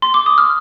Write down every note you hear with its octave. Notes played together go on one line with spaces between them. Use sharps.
C6
D6
D#6
F6